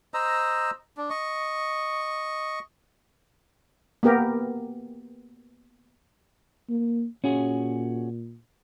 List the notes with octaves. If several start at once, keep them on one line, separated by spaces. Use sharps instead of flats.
C5 D#5 A#5 E6
D4
D#5 C#6
A#3 B3 G4 A#4
A#3
A#2 C#4 F#4 G#4